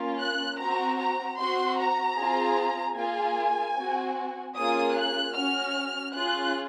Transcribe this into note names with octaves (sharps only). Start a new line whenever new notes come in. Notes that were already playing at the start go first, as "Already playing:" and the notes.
Already playing: A#3 C#4 F4
F#6
C4 F#4 A#5
A#5
C4 F#4 C6
A#5
C4 F4 G#4
A#3 F4 G#4 G#5
C4 F#4
A#3 C#4 F4 G#4 D#6
F#6
C#4 F#4 F6
C#4 F4 G#4 F#6